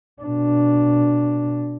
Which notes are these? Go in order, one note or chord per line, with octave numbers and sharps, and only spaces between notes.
B2 D4